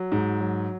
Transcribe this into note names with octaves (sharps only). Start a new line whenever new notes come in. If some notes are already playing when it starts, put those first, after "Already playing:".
Already playing: F#3
G#2
F#3